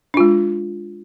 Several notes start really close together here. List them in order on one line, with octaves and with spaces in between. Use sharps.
D4 F4 G#3